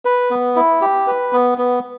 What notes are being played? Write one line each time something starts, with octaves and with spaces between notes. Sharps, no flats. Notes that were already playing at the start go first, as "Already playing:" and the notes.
B4
B3
E4
G4
B4
B3
B3